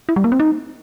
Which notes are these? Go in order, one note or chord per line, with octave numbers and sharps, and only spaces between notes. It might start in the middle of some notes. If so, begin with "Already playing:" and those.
E4
G3
A#3
C4
D#4